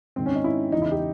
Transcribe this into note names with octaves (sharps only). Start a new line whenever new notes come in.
G#2 D#3 C4
C#4
D#4
E4
E2 C#3 E3 D#4
E4
G4